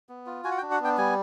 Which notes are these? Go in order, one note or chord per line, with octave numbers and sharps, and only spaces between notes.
B3
F4
F#4 G#5
F#5
G5
D4
F#5
B3 G5
G3 G#5